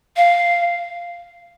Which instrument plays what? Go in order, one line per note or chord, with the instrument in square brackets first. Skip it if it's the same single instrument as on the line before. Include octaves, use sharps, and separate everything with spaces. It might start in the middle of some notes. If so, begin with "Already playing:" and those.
[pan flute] F5